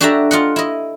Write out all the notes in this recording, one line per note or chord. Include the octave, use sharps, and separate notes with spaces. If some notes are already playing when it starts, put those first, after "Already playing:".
D4 F#4 G4 A4 E5 A#5
F4 D#5 F#5
E4 D#5